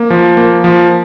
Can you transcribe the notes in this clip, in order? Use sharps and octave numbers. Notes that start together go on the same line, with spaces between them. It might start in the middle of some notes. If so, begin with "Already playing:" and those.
Already playing: A#3
F3
A#3
F3